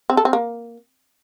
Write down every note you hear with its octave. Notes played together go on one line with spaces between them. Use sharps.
C4
A4
C4
A#3